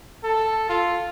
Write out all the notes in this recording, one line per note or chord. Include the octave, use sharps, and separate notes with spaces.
A4
F4